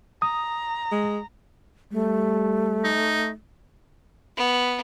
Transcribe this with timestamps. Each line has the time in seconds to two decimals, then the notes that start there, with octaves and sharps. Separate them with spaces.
0.22 A#5 D#6
0.91 G#3
1.92 G3 A3
2.84 D#4
4.37 B3